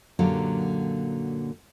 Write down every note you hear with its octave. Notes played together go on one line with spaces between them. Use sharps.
F#2 A#2 D3 F#3 A#3 G4